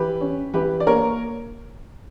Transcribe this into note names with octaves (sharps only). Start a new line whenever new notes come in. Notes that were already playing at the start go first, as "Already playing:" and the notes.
Already playing: E3 G4 B4
C#4
E3 G4 B4
D5
A#3 A#4 C#5